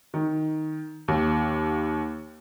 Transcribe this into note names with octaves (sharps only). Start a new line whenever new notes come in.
D#3
D#2